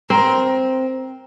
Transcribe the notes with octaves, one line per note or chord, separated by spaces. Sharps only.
C4 A#4